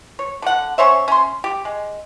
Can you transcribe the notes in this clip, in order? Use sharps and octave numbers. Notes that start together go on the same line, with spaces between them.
C#5
D3 F#5
C#4 C5 C#5 E5
C#4 C6
G4
G#3